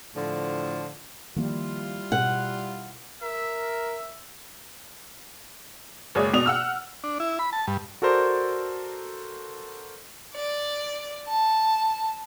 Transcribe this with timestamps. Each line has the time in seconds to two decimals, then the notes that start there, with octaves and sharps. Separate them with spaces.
0.16 A2 D3 F3
1.36 D#3 F3 G3 A#3 E4 F4
2.12 B2 F#5
3.22 A#4 E5
6.15 F#1 G#3 G#4 C#5 D5 D#6
6.34 B2 D5 D#6 F7
6.46 F#5 E6 F6
7.04 D4
7.20 E4
7.39 B5
7.53 A5
7.67 G2
8.02 F#4 A4 A#4 C5 D5
10.34 D5
11.28 A5